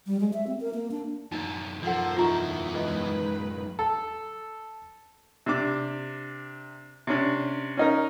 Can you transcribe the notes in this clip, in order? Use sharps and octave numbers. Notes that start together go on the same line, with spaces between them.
G3
G#3
E5
C4
A#4
A#3
D4
F#2 A2 D#4 D5
F3 A4 A#4 C5 D5 F#5
E2 D#3 E4 F4 A#5 C#6
D#3 G#3 B4 D#5
A4
C3 D4 D6
C3 C#4 D4
C#4 D#4 A#4